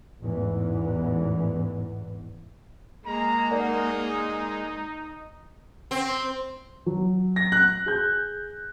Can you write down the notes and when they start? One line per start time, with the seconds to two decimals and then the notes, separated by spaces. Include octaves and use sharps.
0.20 A1 E2 G#2 E3
3.06 G#3 A#3 A#5
3.51 D#4 A#4 D5 F#5
5.91 C4
6.86 F#3
7.36 A#6
7.52 F#6
7.86 G#4 G6